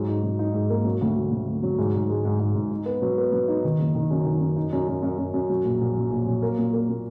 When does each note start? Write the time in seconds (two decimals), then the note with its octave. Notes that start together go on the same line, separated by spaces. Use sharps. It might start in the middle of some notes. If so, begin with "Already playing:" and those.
Already playing: G#2 F#3
0.08 D#4
0.23 F#3
0.39 D#4
0.54 G#2
0.70 A#3
0.85 F#3
1.01 D2
1.16 D2
1.31 D2
1.47 D2
1.63 F#3
1.78 G#2
1.94 G#2
2.09 G#3
2.25 G#2
2.39 G#2
2.55 G#2
2.71 D#4
2.86 B3
3.02 F#3
3.18 B3
3.32 F#3
3.48 D#4
3.64 D#3
3.79 F#1
3.95 D#3
4.11 F#2
4.25 D#3
4.41 F#2
4.56 D#4
4.73 F#2
4.88 F#2
5.03 F#2
5.18 F#2
5.34 F#2
5.50 F#3
5.64 A#1
5.80 A#1
5.96 F#3
6.11 A#1
6.27 F#3
6.42 A#3
6.58 A#2
6.73 A#3
6.89 A#2